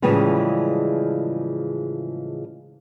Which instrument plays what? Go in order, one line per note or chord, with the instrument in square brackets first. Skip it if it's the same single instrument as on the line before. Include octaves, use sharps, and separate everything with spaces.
[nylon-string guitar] A2 C#3 E3 F3 G3 G#3